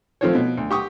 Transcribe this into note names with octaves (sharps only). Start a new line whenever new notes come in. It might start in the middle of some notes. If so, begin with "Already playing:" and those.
F3 A3 C4 F4 C5 C#5
B2
D2
G4 C#6 D#6